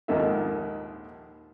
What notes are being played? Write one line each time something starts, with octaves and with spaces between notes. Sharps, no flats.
A#1 D#2 G#2 D#3 A4 E5